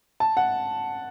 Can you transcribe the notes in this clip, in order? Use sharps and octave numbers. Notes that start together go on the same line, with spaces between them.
A5
F#5